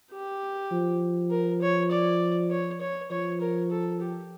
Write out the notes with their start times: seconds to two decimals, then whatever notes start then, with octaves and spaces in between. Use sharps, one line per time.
0.11 G4
0.71 F3
1.31 A#4
1.62 C#5
1.91 D5
2.50 C#5
2.81 C#5
3.11 F3 C#5
3.41 A#4
3.71 A4
4.01 G4